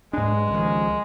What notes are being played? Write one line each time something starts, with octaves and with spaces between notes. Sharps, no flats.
G#2 G#3 D4
C#2 D#3 F3